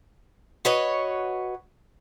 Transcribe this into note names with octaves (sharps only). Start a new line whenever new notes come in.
F#4 B4 C#5 D#5